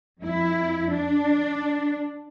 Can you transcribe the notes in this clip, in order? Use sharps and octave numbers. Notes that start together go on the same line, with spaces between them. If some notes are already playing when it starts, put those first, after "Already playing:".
F2 E4
D4